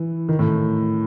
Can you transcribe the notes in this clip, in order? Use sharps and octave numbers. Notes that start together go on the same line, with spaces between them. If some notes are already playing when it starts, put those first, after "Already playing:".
Already playing: E3
D#3
A2